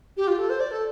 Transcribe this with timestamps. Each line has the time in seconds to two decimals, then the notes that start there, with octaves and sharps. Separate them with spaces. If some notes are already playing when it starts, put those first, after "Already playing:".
0.17 G4
0.27 F4
0.38 A4
0.49 C5
0.60 D5
0.71 A4